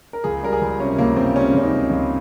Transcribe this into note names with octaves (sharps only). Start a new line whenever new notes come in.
A#4
C#2 G#4
G3 A#4
G#4
C#2
C3 C#4
C#2 A#3
C#2 C4
G3 C#4
C#2 C#4
D#4
C#2
C#2